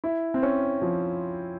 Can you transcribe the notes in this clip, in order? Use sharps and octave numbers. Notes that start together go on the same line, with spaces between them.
E4
C4
C#4
F3